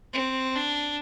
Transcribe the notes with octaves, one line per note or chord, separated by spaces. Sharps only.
C4
D4